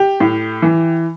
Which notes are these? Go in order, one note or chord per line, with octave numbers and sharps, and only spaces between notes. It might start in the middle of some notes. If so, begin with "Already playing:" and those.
Already playing: G4
A2
E3